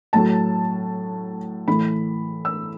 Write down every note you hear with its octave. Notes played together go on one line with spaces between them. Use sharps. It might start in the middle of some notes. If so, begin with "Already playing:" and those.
A2 F#3 A3 A5
A2 E3 A3 B5
E6